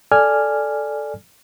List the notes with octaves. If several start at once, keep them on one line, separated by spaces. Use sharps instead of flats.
A4 D5 G#5 F6